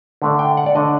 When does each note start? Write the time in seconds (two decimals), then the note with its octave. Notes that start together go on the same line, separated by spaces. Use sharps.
0.22 D3 A3 D4
0.39 G5
0.57 F#5
0.66 D5
0.75 D3 A3 D4 D#5